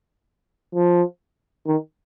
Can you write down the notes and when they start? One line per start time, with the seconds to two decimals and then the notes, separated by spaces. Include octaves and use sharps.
0.75 F3
1.67 D#3